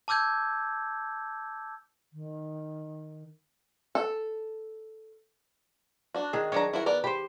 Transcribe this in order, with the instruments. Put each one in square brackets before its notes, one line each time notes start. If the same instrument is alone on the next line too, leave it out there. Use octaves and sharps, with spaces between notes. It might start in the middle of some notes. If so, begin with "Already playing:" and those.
[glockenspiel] A5 D6 E6 G6 G#6
[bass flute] D#3
[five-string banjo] A4
D4 F#4
[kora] D#3 G#4
[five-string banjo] F#3 D4 A#5 [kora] C#5
[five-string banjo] E4 F#4 A#4
B3 A#4 D5
[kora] G4 C5 [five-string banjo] B5